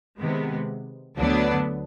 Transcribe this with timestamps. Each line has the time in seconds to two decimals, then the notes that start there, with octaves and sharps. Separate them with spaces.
0.18 C3 D#3 G#3 B3
1.17 D2 D3 F#3 B3 D4